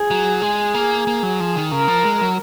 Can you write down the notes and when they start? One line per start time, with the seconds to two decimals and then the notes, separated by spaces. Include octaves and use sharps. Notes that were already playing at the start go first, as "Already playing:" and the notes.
Already playing: G#4
0.11 F#3
0.42 G#3
0.74 A#3
1.07 A#3
1.23 F#3
1.40 F3
1.56 D#3
1.72 C#3 A#4
1.88 F3
2.04 G#3
2.21 F#3